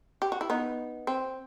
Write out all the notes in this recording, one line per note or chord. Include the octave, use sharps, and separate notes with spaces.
G4
F#4
E4
B3 D#4
C4